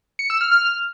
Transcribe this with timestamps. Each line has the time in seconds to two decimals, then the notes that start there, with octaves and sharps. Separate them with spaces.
0.19 C#7
0.30 E6
0.41 F6
0.52 F6